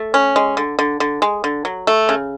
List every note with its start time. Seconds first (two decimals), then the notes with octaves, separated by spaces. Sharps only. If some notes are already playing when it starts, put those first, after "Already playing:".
Already playing: A3
0.14 C#4
0.36 G#3
0.57 D3
0.79 D3
1.00 D3
1.22 G#3
1.44 D3
1.65 F#3
1.87 A3
2.09 C#3